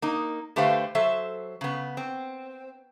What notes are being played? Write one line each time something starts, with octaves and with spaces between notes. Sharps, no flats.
A#3 D#4
D3 A3 G4 B4 C5 F5
F#3 A4 C5 E5
C#3 B3
C4